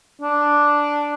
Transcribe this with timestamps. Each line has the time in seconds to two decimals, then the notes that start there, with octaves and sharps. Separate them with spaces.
0.21 D4